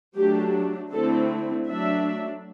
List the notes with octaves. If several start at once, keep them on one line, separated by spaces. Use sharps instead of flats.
F#3 A3 D4 G4
D3 A3 C4 E4 A4
F#3 A3 D4 E5